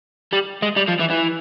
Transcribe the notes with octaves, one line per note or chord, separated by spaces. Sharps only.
G3
G#3
G3
F3
E3
E3